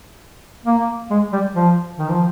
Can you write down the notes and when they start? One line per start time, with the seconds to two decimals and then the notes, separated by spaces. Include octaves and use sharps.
0.66 A#3
1.10 G#3
1.33 G3
1.55 F3
1.98 D#3
2.10 F3